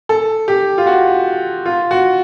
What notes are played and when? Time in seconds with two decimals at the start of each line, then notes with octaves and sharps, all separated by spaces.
0.09 A4
0.48 G4
0.78 F4
0.87 F#4
1.66 F4
1.91 F#4